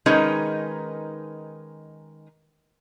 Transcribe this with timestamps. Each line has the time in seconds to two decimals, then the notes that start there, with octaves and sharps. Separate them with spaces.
0.06 D#3 G#3 C#4 D#4 A#4 B4